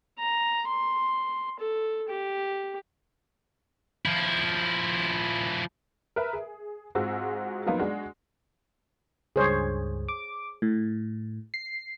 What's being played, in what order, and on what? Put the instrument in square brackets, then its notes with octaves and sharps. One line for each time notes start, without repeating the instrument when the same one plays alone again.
[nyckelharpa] A#5
C6
A4
G4
[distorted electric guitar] F3 E4
[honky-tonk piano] A#4 B4 E5
G#4
G#2 C4 F4 F#4 G#4 E6
F3 F#3 A#3 B3 D#4 F4
G#3 D4 F#4
[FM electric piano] C#2 G2 [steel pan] G#4 C5 C#5
[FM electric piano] D6
A2
C7